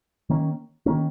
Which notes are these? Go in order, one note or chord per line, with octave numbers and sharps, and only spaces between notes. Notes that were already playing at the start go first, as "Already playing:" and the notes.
D#3 A#3 C#4
D#3 A#3 C#4